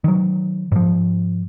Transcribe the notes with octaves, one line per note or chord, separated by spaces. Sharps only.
D#3 F#3
G#2 F3